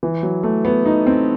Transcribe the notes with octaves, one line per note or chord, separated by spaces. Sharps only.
E3
F#3
A3
B3
D#4
C4